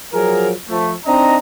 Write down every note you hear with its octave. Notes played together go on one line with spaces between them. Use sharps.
F3 F#3 G#4 A#4
F3 A3
C4 D4 D#4 D#5 A#5